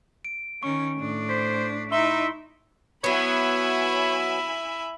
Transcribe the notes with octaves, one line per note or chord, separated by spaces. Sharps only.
D7
D#3 C#4 C#6
A2 D4
C5 B6
D#4 E4 E5 C6 G7
F#3 B3 E4 C#5 E5 G#5 B5